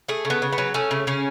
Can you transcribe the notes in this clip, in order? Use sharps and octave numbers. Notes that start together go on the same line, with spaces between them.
A3 G#4
C#3
B3
C#3
B3
F#3
A3 C#4
C#3
C#3 C#4